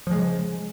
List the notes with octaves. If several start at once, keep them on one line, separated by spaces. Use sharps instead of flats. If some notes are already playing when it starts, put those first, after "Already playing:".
C#3 F3 G#3